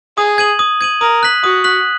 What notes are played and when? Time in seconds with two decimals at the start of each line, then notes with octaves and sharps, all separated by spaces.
0.18 G#4 D#6
0.38 G#6 D#7 F#7
0.59 D#6
0.81 G#6 D#7 F#7
1.01 A#4 D#6
1.23 F#6 B6 F#7
1.44 F#4 D#6
1.64 F#6 B6 F#7